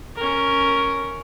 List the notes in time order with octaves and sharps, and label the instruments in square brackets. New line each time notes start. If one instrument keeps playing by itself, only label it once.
[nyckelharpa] C#4 A#4